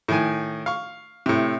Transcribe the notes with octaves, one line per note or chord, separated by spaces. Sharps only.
A2 D#3 G#5
F5 C#6
A2 C3